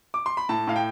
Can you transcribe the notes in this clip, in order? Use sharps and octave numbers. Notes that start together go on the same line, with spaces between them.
D6
C6
B5
A2 A5
A2 F5
G5